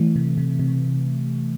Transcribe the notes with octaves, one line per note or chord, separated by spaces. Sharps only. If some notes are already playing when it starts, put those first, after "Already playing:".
Already playing: E3 A3
C3
C3
C3